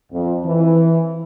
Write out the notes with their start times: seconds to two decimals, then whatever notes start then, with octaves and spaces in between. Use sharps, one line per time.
0.12 F2
0.45 E3